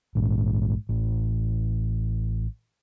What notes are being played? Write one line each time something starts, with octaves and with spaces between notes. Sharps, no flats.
A#1 G#2
A1